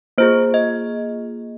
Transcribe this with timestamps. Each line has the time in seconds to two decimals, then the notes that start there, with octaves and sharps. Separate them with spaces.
0.18 A#3 F4 G#4 C5
0.54 D#5